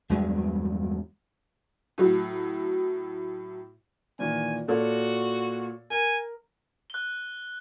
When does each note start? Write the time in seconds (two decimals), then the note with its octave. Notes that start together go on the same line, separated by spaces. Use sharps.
0.09 E2 G2 F#3 G#3
1.98 A2 F#3
4.19 A#2 D#3 E3 G#5
4.68 A#2 F#4 A4 C#5
5.90 A#4 G#5
6.90 F#6 G7